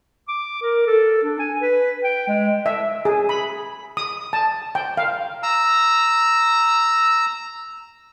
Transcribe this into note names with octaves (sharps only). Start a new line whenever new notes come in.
D6
A#4
A4
D4
G#5
B4
G5
G#3
E5
G#4
B5
D#6
A5
G5
F5
A#5 E6